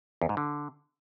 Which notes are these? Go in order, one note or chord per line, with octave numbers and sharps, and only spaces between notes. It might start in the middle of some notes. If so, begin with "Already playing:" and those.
E2
G#2
D3